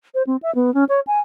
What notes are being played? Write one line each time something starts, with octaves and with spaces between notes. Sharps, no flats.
C5
C4
E5
B3
C#4
C#5
G#5